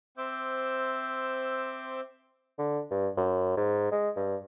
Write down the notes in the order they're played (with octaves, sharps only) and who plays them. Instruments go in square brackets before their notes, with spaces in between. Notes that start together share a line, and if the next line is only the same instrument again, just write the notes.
[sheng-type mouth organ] C4 C5 E5 D6 E6 G6
[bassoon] D3
G2
F#2
G#2
G#3
G2